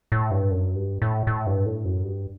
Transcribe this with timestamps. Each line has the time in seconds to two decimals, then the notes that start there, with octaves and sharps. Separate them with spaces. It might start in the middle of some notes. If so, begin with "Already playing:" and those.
0.12 A2
0.31 G2
0.51 F#2
0.76 G2
1.02 A2
1.27 A2
1.47 G2
1.66 A2
1.85 F#2
2.04 G2